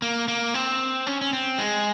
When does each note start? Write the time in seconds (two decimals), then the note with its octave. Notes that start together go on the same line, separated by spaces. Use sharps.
0.02 A#3
0.28 A#3
0.54 C4
1.07 C#4
1.21 C#4
1.33 C4
1.58 G#3